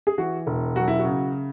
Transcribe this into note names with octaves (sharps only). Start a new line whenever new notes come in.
G#4
E3 F#4
E1
F#3 F#4
E4
F#4
C#3